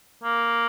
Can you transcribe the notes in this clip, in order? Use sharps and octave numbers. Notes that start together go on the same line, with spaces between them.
A#3